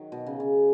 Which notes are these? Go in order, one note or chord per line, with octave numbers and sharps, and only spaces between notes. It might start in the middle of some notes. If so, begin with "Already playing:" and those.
Already playing: D#3 F#3
B2
C#3
C#3